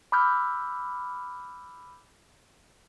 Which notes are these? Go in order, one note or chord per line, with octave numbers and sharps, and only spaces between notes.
B5 D6 E6 F6 G6